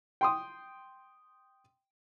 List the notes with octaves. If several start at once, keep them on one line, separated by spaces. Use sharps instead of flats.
G5 C6 D#6